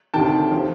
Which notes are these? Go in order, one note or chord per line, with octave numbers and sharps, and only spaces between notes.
D2 C3 D#3 G5 A5
F3